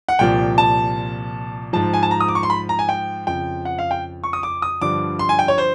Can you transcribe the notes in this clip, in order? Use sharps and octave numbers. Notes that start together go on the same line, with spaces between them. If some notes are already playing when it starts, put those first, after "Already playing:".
F#5
C2 A#2 F3 G5
A5
G#2 F3 A5
G#5
A5
A#5
D#6
D6
C#6
C6
B5
A#5
G#5
G5
F2 C#3 F3 G5
F#5
F5
G5
C#6
D#6
D6
D#6
G2 D3 F3 D6
C6
G#5
G5
C#5
C5